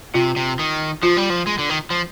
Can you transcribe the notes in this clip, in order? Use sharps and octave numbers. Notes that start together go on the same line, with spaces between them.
C3 F4
C3
D#3
F3 F4
G3
F3
G#3
D3
D#3
F3